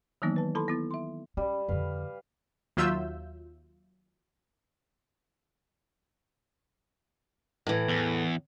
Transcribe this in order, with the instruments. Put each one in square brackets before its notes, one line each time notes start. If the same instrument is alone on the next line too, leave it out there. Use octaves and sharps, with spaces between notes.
[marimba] D#3 E3 F#3 A#3 B3 D#4
B4 A5
E4 A4 A5 B5 C6
B3 E4 A6
E5 C6
[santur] G3 [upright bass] C#4
[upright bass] F2 D3 [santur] B4 F5
[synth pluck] D#2 F#3 F4 E5 E6 G6
[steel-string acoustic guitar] A2 E3
[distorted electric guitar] E2